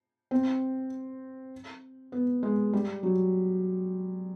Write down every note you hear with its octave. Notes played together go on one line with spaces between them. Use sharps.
C4
B3
G#3
G3
F#3